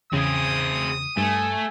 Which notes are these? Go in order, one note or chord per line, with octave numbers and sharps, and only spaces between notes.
E2 C#3 C4 G#4 D#6
G2 A3 G#5